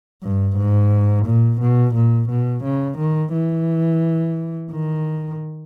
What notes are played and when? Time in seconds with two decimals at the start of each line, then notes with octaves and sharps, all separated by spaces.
0.23 G2
0.57 G#2
1.26 A#2
1.61 B2
1.95 A#2
2.30 B2
2.65 C#3
2.98 D#3
3.33 E3
4.71 D#3